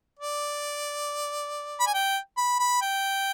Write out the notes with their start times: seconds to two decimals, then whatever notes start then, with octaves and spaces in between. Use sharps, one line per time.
0.20 D5
1.80 B5
1.87 G#5
1.94 G5
2.37 B5
2.59 B5
2.82 G5